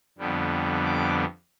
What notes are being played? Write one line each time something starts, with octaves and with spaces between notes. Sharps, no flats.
F2 D3 G3 B3
D6